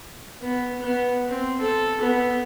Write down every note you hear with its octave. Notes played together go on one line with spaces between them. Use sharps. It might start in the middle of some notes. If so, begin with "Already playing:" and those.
B3
B3
C4
A4
B3